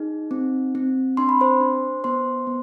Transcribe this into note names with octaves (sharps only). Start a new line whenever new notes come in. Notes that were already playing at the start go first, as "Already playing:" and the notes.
Already playing: D#4 G#4
C4
C4
D4 C6
B5
C5 C6
D4
B3 C5 C6
B3